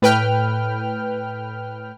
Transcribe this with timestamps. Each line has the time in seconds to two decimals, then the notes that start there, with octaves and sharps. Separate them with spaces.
0.02 A2 B4 G5 F6